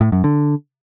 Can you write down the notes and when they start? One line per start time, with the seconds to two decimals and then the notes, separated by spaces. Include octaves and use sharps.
0.01 A2
0.12 F#2
0.24 D3